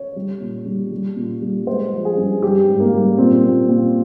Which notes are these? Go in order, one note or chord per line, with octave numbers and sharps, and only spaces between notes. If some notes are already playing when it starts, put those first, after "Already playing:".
Already playing: C#5
G3
A#2
G3
G3
A#2
G3
G#3 C5
F3
G#4
G2
G3 G4
G#2
A#3
G3
A#2 C4
A#2
A#2